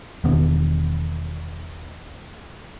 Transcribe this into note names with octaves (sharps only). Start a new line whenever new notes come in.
E1 D#3 B3 D4